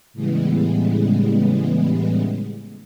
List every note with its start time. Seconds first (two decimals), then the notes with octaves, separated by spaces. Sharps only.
0.13 A2 C#3 E3 G3 G#3 B3